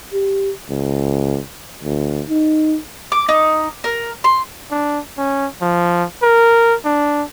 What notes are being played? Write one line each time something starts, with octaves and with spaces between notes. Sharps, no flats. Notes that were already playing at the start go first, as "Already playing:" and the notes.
G4
C#2
D2
D#4
D6
D#4
A#4
C6
D4
C#4
F3
A#4
D4